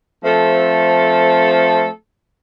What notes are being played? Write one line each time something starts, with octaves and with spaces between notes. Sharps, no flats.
F3 A3 C4 A4